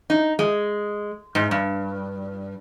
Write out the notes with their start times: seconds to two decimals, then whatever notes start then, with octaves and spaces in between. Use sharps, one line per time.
0.10 D#4
0.39 G#3
1.35 G#2
1.51 G2